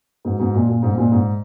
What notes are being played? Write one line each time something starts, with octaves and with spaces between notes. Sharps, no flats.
G#2 B2
G#2 B2
A#2
A#2
G#2
G#2
A#2
G#2